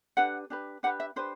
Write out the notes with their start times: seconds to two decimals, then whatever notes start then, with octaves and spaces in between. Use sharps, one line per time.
0.17 D4 G4 B4 F#5
0.50 D4 G4 B4
0.83 D4 G4 B4 F#5
1.00 E5
1.16 D4 G4 B4 C5